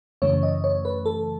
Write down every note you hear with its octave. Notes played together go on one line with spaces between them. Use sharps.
F#2 C#3 E3 A3 C#5
D#5
C#5
B4
A4